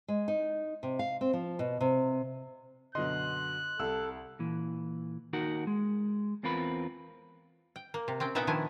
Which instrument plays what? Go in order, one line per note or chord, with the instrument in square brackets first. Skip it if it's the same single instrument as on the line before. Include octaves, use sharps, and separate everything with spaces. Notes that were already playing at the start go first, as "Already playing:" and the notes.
[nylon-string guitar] G#3
D#4
C3
F5
C4
F3
B2
C3
[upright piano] F#2 B2 D3 [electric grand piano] D#5 C6 [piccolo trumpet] F#6
[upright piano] C2 [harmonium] A4 [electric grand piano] E6
[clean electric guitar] A#2 E3
D#2 D#4 F#4 A#4 F#5
G#3
E2 C4 F4 A#4 B4 B5
[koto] G5
A#3
C3
C4 C#4 G5
A#2 B3 D#4 E5 F#5 G5
D#3 F3 D4 E4 G#5